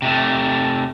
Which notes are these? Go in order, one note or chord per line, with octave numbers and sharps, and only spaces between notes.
C3 A3